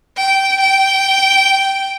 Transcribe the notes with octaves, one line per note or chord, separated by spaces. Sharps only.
G5
G5